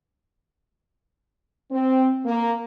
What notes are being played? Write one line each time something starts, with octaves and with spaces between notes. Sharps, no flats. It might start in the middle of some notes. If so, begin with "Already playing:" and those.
C4
A#3